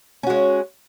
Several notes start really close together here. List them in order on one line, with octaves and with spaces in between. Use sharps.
C#4 F#4 G#3